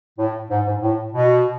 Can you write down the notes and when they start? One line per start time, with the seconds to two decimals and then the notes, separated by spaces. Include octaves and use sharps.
0.19 A2
0.50 G#2
0.67 G#2
0.82 A2
1.13 B2